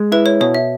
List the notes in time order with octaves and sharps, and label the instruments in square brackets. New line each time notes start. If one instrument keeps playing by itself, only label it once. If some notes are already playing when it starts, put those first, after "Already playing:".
Already playing: [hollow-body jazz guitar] G#3
[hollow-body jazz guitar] E4 [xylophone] B4
[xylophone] C#5
[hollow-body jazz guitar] B2 [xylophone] C#5
[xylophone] E5